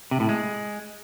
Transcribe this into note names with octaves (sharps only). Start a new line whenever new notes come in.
C3
A2
G#3